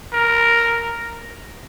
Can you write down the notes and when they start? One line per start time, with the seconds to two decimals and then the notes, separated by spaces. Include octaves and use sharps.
0.13 A#4